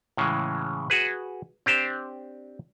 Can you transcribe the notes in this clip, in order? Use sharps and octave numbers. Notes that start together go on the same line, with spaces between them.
A2 C#3 E3 G#3
F#4 G#4 B4
C4 D4 G4 C5